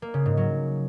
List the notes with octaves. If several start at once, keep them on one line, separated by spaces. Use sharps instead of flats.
A#3
C#3
G#2
F#3